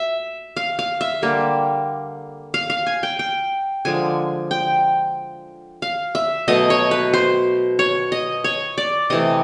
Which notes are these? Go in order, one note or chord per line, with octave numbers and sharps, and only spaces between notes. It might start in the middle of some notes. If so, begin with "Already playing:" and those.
Already playing: E5
F5
F5
E5
D3 G3 A#3
F5
F5
G#5
G5
G5
D3 F3 G#3 G#5
G5
F5
E5
B2 F#3 A3 D#5
C#5
B4
C5
C#5
D#5
C#5
D5
C3 E3 A3 D#5